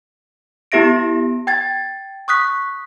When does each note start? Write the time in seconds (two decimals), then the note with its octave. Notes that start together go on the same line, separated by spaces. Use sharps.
0.72 B3 E4 G4 E5 A#6 D7
1.47 G5 G#6 A6
2.28 C#6 D#6 F#6 B6